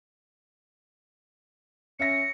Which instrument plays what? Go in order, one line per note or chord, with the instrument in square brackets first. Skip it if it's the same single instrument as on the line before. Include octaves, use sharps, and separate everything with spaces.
[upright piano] C#4 E5 A#6 [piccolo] C#7